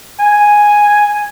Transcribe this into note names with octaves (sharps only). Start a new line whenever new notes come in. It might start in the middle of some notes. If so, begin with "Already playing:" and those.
G#5